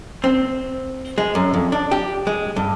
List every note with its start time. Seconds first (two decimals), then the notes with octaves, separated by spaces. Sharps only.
0.24 C4
1.18 G#3
1.35 F#2
1.54 F2
1.72 D4
1.91 G4
2.27 G#3
2.56 G2